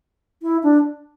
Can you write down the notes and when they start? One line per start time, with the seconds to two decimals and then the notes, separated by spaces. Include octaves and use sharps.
0.43 E4
0.63 D4